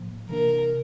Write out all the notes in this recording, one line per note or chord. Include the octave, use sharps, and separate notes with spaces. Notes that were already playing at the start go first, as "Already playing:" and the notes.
Already playing: A2 F3 A#3
C3 E3 A#3 D4 A#4